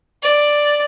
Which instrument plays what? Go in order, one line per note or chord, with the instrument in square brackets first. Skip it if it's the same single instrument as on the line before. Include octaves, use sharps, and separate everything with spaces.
[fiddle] D5